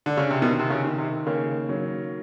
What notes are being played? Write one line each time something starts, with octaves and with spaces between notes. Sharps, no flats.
D3
C#3
C3
B2 D#3
C3
C#3
D#3
C3
C#3 A#3
F#3